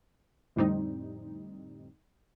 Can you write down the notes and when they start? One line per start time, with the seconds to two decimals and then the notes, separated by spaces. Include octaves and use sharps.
0.56 F2 A2 D3 G3 C4 D#4